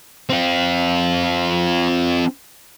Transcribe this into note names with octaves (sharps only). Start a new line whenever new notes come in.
C4 F4